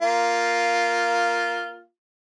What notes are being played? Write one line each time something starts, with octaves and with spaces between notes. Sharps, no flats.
A#3 F4